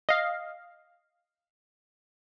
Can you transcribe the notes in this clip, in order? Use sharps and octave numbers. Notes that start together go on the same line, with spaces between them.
D#5 F5